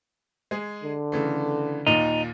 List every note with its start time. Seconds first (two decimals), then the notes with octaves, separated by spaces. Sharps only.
0.51 G#3 G#4
0.83 D3
1.12 C#3 E3 A3
1.87 D#2 A#2 D#4